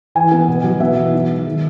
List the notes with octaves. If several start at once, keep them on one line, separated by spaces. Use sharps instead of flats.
E3 G#5
B3
B2
F#3
B3 E5
E3
D#4
G#3
D#3